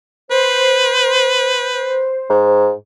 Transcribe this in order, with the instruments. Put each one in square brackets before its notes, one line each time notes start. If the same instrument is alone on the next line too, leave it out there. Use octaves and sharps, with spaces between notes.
[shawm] B4 [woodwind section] C5
[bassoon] G#2